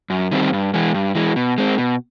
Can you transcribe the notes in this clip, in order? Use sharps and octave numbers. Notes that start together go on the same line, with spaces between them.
F#2
D#3 G3 C4
G2
E3 G#3
G2
E3 G#3
B2
G#3 C4
B2